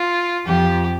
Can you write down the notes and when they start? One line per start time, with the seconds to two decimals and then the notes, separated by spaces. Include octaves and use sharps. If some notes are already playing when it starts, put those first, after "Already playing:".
Already playing: F4
0.47 F2 G4